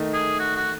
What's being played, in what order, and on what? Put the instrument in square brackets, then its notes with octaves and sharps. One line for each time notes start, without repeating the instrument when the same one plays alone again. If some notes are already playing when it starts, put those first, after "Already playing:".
Already playing: [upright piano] D#3 A3 D#4
[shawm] G#4
F#4
F#4